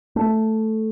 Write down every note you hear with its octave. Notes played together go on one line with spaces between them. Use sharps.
A3